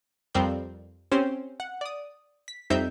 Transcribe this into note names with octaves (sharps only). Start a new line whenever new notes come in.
F2 G3 C4 A#4 D5 G6
C4 C#4 G4 C5
F#5
D5 D#6
B6
F2 G3 C4 D#4 E5 G6